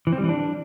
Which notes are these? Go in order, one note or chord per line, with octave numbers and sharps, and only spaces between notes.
E3
C4
G3
E3
D4